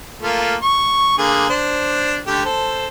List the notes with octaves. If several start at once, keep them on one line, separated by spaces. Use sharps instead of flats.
A3 A#3 F4
C#6
D3 A#3 G#4
D4 C5
D3 A3 G4
A4 C5